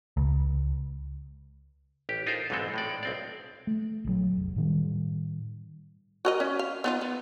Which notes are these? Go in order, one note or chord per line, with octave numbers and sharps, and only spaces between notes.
C#2
A1 G4
D#4 F4 G#4 A#4 C5
B1 G#2 E3 G#3 C4 A4
A2 G#3 D5
B1 C4 D5
A3
A#1 D#3 F#3
F1
A2 D#3 G3
F#4 A#4 D#5
C#4
F5
B3 D#4 F4
B3